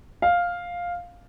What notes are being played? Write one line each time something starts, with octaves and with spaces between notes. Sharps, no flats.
F5